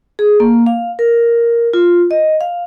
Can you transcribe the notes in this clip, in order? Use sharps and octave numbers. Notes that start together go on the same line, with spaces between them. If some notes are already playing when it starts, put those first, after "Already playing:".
G#4
A#3
F5
A#4
F4
D#5
F5